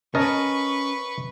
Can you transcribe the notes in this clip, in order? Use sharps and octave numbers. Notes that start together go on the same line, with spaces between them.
C#4 A#4 B4 D#5 A5 C#6